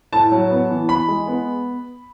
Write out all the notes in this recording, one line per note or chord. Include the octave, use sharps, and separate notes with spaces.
A2 A5
F#3
B3
E3
E3 B5
G#3
B3